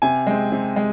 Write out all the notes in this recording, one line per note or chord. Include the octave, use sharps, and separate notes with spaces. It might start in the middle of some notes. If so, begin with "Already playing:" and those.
C3 G#5
G#3 C4
C3
G#3